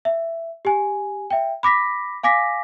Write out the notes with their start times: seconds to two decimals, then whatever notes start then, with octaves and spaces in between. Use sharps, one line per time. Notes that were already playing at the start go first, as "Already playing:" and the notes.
0.05 E5
0.65 G4 G#5
1.30 E5 G5
1.63 B5 D6 A#6 B6
2.23 F5 G#5 D6 A#6 B6